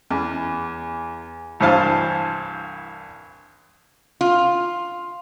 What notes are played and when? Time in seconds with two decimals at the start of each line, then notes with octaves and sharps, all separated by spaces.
0.10 E2
1.60 C2 G2 E3 C5 F5 A5
4.21 F4